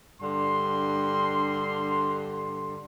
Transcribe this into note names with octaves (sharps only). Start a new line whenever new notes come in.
G2 D3 C6